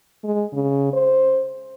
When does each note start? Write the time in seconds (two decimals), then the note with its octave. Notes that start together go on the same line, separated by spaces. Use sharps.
0.24 G#3
0.53 C#3
0.93 C5